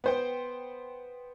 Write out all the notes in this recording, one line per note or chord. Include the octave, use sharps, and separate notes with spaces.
B3 C5 G5